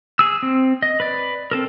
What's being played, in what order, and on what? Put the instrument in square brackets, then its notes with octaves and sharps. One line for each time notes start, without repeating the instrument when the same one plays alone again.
[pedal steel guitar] G#4 E6
C4
D#5
B4 D5
C4 A4 A#4